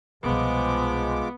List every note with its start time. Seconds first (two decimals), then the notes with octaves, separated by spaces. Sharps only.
0.24 C2 B2 F3 G#3 B3 D6